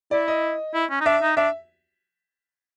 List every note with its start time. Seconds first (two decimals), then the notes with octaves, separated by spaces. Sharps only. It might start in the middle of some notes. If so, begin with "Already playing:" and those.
0.11 E4 D5
0.28 D#5
0.74 E4
0.90 C#4
1.01 D#4
1.06 D4 E5
1.22 D#4
1.37 D4 E5